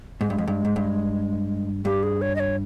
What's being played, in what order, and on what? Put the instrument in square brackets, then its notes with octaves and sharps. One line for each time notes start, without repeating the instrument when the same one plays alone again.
[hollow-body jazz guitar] G#2 [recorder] G#3
[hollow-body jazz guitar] G2
F2
G2
G#2
G2
[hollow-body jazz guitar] G2 [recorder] G4
[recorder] G#4
C#5
D#5
C#5